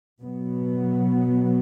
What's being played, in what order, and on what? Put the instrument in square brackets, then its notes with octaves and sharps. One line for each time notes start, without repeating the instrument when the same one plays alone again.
[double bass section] B2 F#3 B3